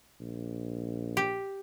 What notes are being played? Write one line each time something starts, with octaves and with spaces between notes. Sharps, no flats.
A#1
G4